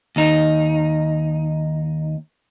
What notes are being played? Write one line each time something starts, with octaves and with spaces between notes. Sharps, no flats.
D#2 D#4